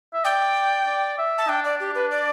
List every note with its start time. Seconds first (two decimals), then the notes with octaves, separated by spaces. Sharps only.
0.14 E5
0.24 D5 G5
0.86 D5
1.18 E5
1.38 A5
1.48 D4 G5
1.65 D5
1.80 G4
1.95 B4
2.11 D5